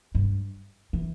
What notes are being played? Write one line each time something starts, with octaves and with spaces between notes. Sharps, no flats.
G2
E3